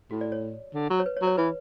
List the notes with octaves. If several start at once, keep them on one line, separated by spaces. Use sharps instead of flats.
A2 F#4
D5
C#5
D3
F#3
C#5
B4
C#5
F#3
C#5
E3 B4